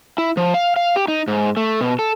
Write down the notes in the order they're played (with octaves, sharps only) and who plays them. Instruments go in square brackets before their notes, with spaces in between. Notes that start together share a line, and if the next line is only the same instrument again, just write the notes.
[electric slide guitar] E4
F3
F5
F5
G4
D#4
G#2
A3
B2
A4